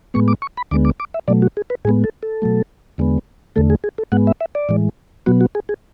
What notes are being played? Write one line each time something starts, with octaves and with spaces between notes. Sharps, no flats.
A2 G#3 B3 C#6
D6
C#6
B5
D2 D3 G#3 B3 D6
D6
D6
E5
B2 F#3 A3 D5
F#4
G#4
B4
A2 G#3 B3 G#4
A4
A4
B2 F#3 A3
E2 D3 G#3 B3
E2 D3 A3 A4
G#4
G#4
A4
G#2 G#3 B3 F#5
E5
E5
D5
A2 E3 G#3
B2 F#3 B3 F#4
F#4
G#4
G#4